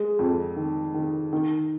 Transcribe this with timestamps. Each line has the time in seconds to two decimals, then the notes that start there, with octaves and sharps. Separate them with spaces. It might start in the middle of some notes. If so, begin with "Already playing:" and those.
Already playing: G#3
0.19 F2
0.56 D#3
0.94 D#3
1.33 D#3